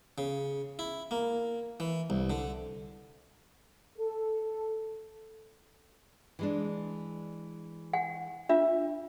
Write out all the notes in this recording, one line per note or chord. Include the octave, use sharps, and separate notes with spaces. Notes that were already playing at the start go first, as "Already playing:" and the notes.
C#3
E4
A#3
E3
C2
D3
A4
E3 G#3 D4
F#5 G#5
D4 F4 E5